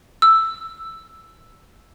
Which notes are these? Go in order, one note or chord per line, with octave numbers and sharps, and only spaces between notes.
E6